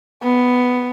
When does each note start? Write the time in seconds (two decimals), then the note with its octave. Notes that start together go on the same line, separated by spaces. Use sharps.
0.23 B3